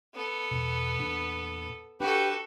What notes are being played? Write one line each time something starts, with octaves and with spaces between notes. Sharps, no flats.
B3 A4
E2 B2
E2 A#2 D4
D4 F#4 G4 A4 B4